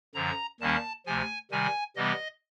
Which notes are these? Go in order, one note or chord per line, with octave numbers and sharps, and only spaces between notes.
F#2 D3 F3 A#5
D#2 D#3 G3 A#3 C#4 A5
D2 C3 F3 G#5
C3 D#3 G3 G#5
C3 E3 G3 B3 D#5